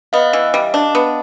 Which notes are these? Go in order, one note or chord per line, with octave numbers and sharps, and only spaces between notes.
B3 D#5 F5
E3
G3
D4
B3